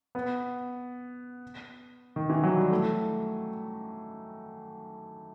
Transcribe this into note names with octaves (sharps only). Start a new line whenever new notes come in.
B3
D#3
E3
F#3
G3
A3